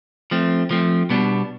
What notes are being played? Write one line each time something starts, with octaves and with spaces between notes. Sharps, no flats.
F3 A3 C4
F3 A3 C4
B2 G3 B3 D4